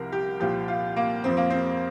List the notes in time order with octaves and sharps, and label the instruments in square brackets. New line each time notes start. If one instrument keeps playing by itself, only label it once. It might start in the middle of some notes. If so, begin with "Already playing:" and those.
Already playing: [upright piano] C2 C3 F3 A#4
G4
C2 A#2 F3 G4
F4
A#3
F2 F3 C4
A#3
C4